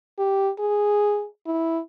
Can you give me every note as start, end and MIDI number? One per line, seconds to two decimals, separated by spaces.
0.18 0.50 67
0.59 1.25 68
1.46 1.79 64